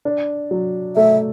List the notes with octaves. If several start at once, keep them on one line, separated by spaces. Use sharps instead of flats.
D4
F#3
A3 E5